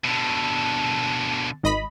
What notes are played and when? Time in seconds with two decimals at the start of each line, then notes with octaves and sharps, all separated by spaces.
0.04 B2 D3 A5
1.63 G#1 D#5 B5